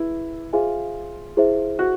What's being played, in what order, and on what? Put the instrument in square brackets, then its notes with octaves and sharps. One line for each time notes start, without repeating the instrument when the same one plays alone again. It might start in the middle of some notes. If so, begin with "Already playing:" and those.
Already playing: [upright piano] E4 [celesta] G#4 B4
[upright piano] F4 [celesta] G#4 C5 E5 G#5
[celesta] E4 G#4 C5 E5
[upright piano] F#4